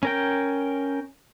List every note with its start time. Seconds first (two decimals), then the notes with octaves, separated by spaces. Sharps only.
0.03 C#4 A#4 G5